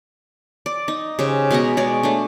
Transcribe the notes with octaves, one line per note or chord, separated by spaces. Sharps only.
D5
D#4
C#3 G4 C5
B2 G#3 F#5 A#5
G#3 C#5 D5
A3 D4